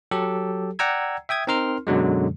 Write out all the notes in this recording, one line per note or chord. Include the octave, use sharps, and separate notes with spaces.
F#3 G4 A4
D5 F#5 G5 A#5 E6 G#6
E5 G5 D#6 G#6
C4 D#4 A#4 C6 F6
F#2 B2 D3 F#3 G#3